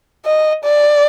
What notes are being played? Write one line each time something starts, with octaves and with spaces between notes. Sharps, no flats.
D#5
D5